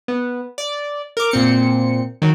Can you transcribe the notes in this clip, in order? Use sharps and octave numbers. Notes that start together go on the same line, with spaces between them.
B3
D5
A#4 D6
A#2 C4 C#7
D#3 F#3